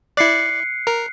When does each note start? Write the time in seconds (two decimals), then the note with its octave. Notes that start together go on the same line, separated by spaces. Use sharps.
0.17 E4 D5 F#6 C7 C#7
0.87 A#4